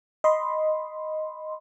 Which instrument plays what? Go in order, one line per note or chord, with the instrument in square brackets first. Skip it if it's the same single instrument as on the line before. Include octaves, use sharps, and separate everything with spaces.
[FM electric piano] D#5 B5 C6